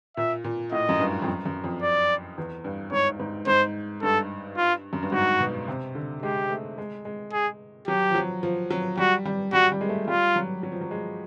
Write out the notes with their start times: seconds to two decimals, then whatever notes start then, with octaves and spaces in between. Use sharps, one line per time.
0.17 A#2 E5
0.44 A#2
0.72 A2 D#5
0.89 F#2
0.99 G2
1.22 F2
1.27 F#2
1.46 F#2
1.64 F2
1.82 D5
2.38 E2
2.64 G2
2.92 G#2 C#5
3.20 G#2
3.47 G#2 C5
4.02 G2 A4
4.57 F4
4.93 F#2
5.03 G2
5.12 G#2 F#4
5.40 B2
5.68 C3
5.95 D3
6.22 G#3 G4
6.50 A3
6.78 G#3
7.05 G#3
7.33 G#4
7.88 F#3 G4
8.10 F3
8.15 F#3
8.43 F3
8.70 F#3
8.97 G3 F#4
9.25 G3
9.53 G3 F#4
9.72 G3
9.81 G#3
9.89 A3
10.07 G3 F4
10.36 F#3
10.63 F#3
10.72 F3
10.81 F#3
10.91 G#3